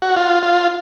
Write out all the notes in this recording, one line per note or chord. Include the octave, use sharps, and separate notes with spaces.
F#4
F4
F4